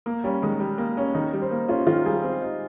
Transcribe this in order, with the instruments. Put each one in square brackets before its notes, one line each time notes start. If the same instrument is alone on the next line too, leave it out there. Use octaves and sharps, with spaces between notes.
[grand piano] A#3
[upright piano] G3 [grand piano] C#4
[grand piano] D#3 [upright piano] G#3
[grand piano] G3
A#3
C#4
[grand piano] D#3 [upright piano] D#4
[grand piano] G3
[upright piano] C5
[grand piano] A#3
[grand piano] C#4 [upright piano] F4
[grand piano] D#3 [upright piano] F4
[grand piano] G3 [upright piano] G#4
[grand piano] C4
D#4